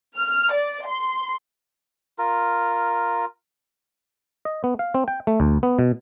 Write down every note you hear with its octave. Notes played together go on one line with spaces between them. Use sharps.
F6
D5
C6
F4 A#4
D#5
B3
F5
C4
G5
A3
D2
B3
B2